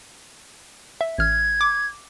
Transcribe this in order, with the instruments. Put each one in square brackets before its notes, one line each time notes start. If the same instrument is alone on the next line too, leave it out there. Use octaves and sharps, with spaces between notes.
[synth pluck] E5
[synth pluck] A1 F6 [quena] G#6
[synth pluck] D6